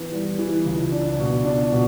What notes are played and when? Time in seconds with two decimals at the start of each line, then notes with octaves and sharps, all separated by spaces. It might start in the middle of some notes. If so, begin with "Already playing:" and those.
Already playing: E3 B3
0.12 G3
0.39 E3
0.66 C#2
0.92 D4
1.19 B2
1.45 D4
1.72 B2